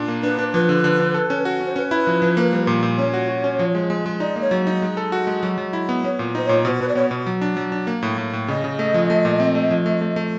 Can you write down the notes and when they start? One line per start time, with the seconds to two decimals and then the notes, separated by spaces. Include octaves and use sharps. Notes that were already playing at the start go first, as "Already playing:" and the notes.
Already playing: A#2 D4
0.08 A#3
0.23 D4 B4
0.38 D4
0.54 F3 B4
0.69 D3
0.84 D3
1.00 D3
1.14 A4
1.30 C#4
1.45 F#4
1.61 C#4
1.66 C5
1.76 C#4 B4
1.91 E4
2.07 F3
2.22 F3
2.37 A#3
2.53 G3
2.67 A#2
2.83 A#2
2.98 C#4 C#5
3.14 F#4
3.29 F#4
3.44 C#4
3.59 F3
3.75 G#3
3.90 G#3
4.06 G#3
4.20 D#4 D5
4.36 A#3
4.41 C#5
4.51 F#3
4.67 D#4
4.82 G#3
4.97 A4
5.12 F#4
5.27 G#3
5.43 F#3
5.58 F#3
5.73 E4
5.89 B3
6.04 B3 C#5
6.19 A#2
6.35 D#4 C5
6.45 A#2 C#5
6.65 B2 C5
6.75 C5
6.81 B2 B4
6.89 D5
6.95 B3 C#5
7.11 B2
7.27 F#3
7.41 D4
7.57 F#3
7.72 D4
7.87 A#3
8.03 A2
8.18 A2
8.33 A2
8.48 C#3 D#5
8.64 C#3
8.79 A3
8.94 F3
9.10 A3
9.25 A#2
9.40 C4
9.55 A3
9.71 F3
9.86 A3
10.01 A3
10.16 A3